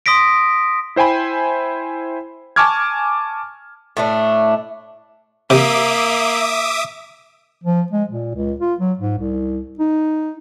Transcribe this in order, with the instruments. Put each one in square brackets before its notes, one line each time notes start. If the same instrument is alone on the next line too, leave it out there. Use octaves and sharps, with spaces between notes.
[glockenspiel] C6 D#6 A#6 B6 D7
[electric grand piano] E4 C5 G5 G#5 B5
G#5 A5 C#6 D6 F6 G#6
[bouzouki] A2 A3 D4
[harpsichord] C3 [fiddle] A#3 [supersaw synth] E5 D6 D#6
[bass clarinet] F3
G#3
A#2
C#2
F4
F#3
G#2
C2
D#4